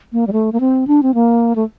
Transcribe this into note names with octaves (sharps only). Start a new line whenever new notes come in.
A#3
G3
A3
A#3
C4
D4
C4
A#3
A3